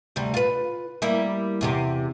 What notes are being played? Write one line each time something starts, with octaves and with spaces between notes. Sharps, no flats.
D2 C3 G3
F4 B4
G3 A#3 E4
E2 C3 G4